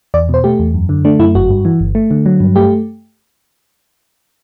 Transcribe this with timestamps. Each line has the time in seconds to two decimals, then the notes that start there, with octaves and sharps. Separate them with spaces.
0.14 E2 D5
0.29 B2 C5
0.44 A3 G4
0.59 E2
0.74 F#2
0.89 D3
1.05 A3 D4
1.19 F#2 E4
1.35 G1 F#4
1.50 G2
1.65 E3
1.80 G1
1.95 A3
2.11 D3
2.26 F#3
2.40 G2
2.56 A3 G4